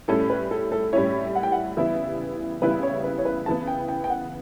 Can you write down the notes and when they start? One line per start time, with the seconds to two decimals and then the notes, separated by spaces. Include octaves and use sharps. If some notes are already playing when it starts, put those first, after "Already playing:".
0.08 A2 G3 C#4 E4 A4
0.30 B4
0.51 A4
0.72 A4
0.93 A2 G3 C#4 E4 C#5
1.35 F#5
1.43 G5
1.52 F#5
1.77 C#3 E3 G3 B3 E4 E5
2.62 C#3 E3 G3 B3 E4 B4
2.83 C#5
3.04 B4
3.18 C#5
3.25 B4
3.46 C#3 E3 B3 A5
3.67 G5
3.88 G5
4.04 G5
4.10 F#5